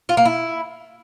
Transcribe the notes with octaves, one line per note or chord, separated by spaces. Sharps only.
F4
A#3
E4